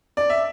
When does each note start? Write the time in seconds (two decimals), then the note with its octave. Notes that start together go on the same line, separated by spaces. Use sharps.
0.17 D5
0.30 E5